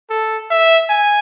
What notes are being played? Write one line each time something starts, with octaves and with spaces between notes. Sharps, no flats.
A4
E5
G#5